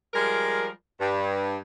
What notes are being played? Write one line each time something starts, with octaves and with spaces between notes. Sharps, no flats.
F3 G3 G#3 A#4
G2